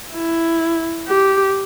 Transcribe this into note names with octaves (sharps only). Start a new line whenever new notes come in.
E4
G4